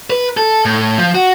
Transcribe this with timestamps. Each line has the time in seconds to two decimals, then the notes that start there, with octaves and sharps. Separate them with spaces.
0.10 B4
0.37 A4
0.65 A2
0.98 F3
1.15 F#4